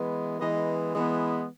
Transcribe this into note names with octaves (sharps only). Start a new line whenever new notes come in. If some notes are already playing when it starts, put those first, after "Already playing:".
Already playing: E3 G#3 B3
E3 G#3 B3 D#5
E3 G#3 B3